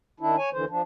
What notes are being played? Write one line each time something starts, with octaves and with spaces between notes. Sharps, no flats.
D#3 D4 E4
C#5 G#5
D#2 D3 E3 C5
F3 D4